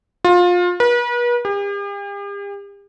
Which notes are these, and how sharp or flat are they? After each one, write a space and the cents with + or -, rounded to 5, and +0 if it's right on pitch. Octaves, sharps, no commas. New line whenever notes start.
F4 +25
B4 -40
G4 +45